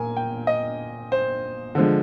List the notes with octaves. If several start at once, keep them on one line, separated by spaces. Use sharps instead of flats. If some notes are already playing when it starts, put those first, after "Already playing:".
Already playing: A#2 A#4 G#5
G5
D#5
C5
D3 F3 G#3